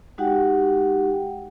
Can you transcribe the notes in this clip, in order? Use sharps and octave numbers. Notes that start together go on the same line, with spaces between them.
G#3 D#4 F#4 G4 F#5 G5